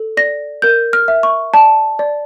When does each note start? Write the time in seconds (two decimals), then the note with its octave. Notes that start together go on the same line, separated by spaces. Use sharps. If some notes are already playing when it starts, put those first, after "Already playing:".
Already playing: A4
0.17 D5 A#6
0.62 A#4 G6
0.93 F6
1.08 E5
1.23 C#6
1.54 D5 A5
1.99 D5